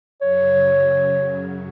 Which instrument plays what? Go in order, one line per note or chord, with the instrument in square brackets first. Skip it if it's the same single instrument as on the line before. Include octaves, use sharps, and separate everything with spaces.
[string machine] F#2 C#3 F#3 [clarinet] C#5